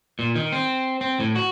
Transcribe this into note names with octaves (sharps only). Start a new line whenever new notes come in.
A#2
D#3
C4
C4
A2
F#4